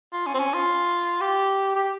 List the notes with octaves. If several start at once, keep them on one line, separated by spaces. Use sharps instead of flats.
F4
C#4
C4
C#4
F4
G4
G4